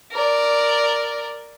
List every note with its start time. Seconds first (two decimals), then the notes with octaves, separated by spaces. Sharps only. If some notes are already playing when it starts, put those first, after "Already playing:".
0.12 A#4 D5